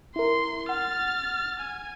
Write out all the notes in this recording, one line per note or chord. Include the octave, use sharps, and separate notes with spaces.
E4 A#4 C6
F#5 F6 A6
G#5